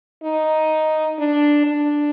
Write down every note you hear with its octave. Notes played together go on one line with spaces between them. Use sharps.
D#4
D4
D4